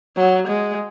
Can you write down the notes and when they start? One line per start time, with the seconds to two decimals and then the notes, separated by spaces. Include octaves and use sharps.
0.17 F#3
0.48 G#3